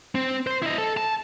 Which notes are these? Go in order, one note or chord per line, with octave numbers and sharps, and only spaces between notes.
C4
C5
E4 D#5
A4
A5